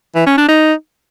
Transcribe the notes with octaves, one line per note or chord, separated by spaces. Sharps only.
E3
C#4
D4
D#4